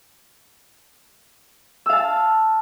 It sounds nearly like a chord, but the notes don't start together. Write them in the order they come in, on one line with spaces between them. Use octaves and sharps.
E6 F5 A5